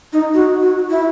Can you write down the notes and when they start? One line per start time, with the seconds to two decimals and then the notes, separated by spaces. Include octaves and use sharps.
0.13 D#4
0.34 F#4
0.62 F#4
0.90 E4